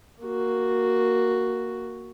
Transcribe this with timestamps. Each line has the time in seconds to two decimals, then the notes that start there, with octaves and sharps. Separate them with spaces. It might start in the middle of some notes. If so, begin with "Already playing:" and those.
0.22 A#3 F#4